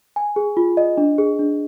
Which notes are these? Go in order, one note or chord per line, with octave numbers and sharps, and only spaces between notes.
G#5
G#4
F4
D#5
D4
G#4
D4